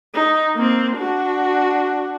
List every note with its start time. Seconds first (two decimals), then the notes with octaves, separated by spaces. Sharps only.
0.14 D#4
0.55 A#3 C4
0.96 D4 F#4